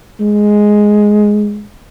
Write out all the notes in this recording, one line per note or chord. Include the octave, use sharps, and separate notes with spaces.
G#3